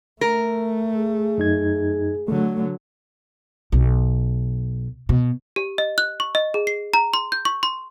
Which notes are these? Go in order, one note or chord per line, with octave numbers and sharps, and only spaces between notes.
A3 A#4
G#4
F#2 D#4 G#6
D3 F#3 A3
B1
B2
G4
D#5
F#6
C#6
D#5
G#4
C7
A#5
C6
G6
C#6
C6